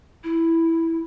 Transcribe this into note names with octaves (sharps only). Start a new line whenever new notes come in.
E4